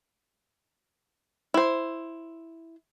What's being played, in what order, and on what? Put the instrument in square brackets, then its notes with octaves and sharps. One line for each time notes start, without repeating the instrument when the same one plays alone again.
[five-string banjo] E4 C5